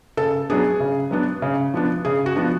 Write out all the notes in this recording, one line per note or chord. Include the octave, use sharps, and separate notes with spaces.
C#3 A4
F#3 B3 D4 G#4
C#3
F#3 B3 D4
C#3
F3 B3 D4
C#3 G#4
F#4
F3 B3 D4